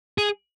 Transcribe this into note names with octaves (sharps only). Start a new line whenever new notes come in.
G#4